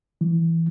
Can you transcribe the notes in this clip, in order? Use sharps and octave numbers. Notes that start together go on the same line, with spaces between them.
E3